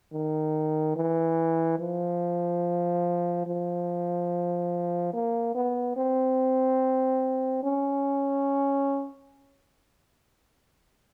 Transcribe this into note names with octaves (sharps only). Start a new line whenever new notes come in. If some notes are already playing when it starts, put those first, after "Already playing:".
D#3
E3
F3
F3
A#3
B3
C4
C#4